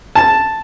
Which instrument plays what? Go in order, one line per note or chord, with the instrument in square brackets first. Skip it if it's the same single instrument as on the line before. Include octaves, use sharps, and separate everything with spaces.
[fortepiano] A5